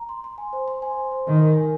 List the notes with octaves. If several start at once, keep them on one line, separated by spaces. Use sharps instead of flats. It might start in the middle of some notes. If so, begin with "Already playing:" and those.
Already playing: A#5
C6
C6
G#5
C5
C6
G#5
C5
C5
D#3 A#4
A#4
G#5